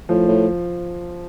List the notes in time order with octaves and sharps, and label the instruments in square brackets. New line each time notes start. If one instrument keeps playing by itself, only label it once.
[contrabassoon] A2 [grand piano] F3
[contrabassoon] A2